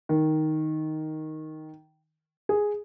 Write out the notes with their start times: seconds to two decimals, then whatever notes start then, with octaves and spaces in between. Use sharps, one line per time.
0.09 D#3
2.49 G#4